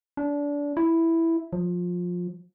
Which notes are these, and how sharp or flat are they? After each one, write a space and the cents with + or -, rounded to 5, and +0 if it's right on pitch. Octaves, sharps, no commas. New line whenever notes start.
D4 -25
E4 +0
F3 +20